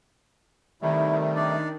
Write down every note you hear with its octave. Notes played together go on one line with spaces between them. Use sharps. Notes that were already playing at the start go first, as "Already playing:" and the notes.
C3 D#3 G3 A3 E4
D4 D#4 D5